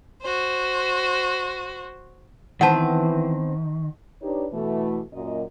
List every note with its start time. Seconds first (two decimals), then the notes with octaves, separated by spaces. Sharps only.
0.22 F#4 C5
2.61 D#3 E3 B3 C4 F#5 A5
4.22 D4 D#4 G4 B4 C#5
4.52 B2 E3 A3
5.13 F#2 A#2 D#5